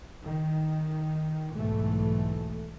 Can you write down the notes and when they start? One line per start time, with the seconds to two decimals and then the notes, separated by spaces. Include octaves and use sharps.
0.24 D#3
1.56 B1 G#2 E3 A3